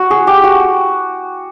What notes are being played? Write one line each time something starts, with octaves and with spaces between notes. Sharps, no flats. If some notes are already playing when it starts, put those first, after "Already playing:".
Already playing: F#4
G#4
G4
F#4